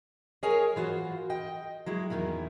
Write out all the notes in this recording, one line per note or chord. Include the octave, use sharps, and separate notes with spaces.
G#4 A#4 C#5 D#5 G#5
E3 F4 F#4 C5
D#5 G5
F#3 G#3 E4
E2 G#2 D#3 C#4 E4